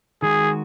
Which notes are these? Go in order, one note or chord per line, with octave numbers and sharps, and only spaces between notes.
D#3 G#3 F#4 G#4